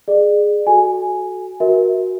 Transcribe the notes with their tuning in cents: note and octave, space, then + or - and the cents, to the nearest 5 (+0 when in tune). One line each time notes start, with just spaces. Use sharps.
G#4 +0 D5 +35
F#4 +0 A4 -25 G#5 +0
F#4 +0 A#4 +15 E5 -20